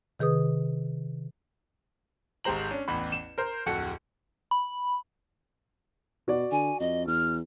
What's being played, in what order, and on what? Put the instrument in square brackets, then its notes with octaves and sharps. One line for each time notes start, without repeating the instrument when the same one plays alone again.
[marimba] C3 D#3 G#4 B4 D#6
[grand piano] G#1 G#3 G4 C5 A#5 F#7
C#4 D4
A1 E2 B5
E7
A#4 C5
D1 F2 F#4 A4 C#7
[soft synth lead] B5
[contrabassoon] B2 [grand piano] F#4 D5
[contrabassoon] D3 [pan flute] G#5
[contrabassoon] F2 [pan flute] D#5
[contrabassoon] E2 [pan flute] F6